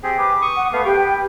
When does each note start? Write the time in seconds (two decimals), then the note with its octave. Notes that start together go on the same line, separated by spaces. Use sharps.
0.03 C4 G4 G#4
0.18 G4 B4 D6
0.42 C#6 D#6
0.56 F#5
0.73 A3 B3 B4 F5
0.85 G4 B4 G5